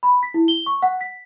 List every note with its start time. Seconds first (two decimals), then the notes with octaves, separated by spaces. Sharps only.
0.03 B5
0.23 B6
0.34 E4
0.48 G7
0.66 C#6
0.82 F#5
1.01 B6